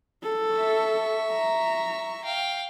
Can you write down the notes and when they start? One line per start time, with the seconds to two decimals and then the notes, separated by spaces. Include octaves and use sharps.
0.23 A4
0.56 E5 C#6
1.32 A#5
2.24 F5 G5